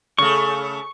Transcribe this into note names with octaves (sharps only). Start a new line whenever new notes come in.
C#3 A3 C#6